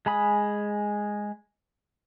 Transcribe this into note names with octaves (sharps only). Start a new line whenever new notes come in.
G#3 G#5 B5 D#6